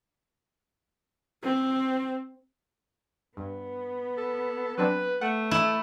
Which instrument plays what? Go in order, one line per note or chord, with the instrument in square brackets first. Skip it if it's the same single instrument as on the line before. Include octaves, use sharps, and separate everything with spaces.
[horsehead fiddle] C4
[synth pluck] G2 [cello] B3
[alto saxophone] A4
[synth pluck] F#3 C4 D4 [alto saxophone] B4
[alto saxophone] A3 [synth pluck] F#5
[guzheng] E4